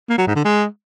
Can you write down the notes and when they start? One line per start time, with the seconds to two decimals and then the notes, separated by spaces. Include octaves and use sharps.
0.09 A#3
0.18 F#3
0.27 G#2
0.36 D3
0.45 G#3